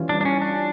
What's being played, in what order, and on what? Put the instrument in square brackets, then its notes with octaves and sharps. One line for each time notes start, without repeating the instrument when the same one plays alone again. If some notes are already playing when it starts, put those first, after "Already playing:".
Already playing: [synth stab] E3 G3 C#4 F4
[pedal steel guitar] D4
D4
C#4
D4